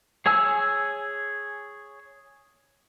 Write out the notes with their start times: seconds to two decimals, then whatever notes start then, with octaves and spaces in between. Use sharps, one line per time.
0.26 G#4 C#5 G#5 E6